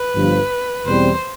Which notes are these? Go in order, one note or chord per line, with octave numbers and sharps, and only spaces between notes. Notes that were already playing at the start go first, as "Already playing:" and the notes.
Already playing: B4
G1 G2 F3
E2 B2 G3 C4 C5